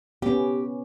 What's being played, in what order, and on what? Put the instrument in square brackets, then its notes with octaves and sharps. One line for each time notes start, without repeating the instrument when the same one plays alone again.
[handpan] B3 C#4 [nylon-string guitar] G4